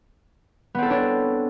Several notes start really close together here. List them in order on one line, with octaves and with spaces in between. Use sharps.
B3 C4 A4 C#5 D4